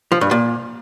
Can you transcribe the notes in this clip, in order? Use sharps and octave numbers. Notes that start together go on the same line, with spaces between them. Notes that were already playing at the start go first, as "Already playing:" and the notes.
F3
G2
A#2